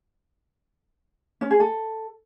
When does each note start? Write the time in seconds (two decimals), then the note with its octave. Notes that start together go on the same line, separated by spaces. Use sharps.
1.41 C#4
1.51 G#4
1.60 A4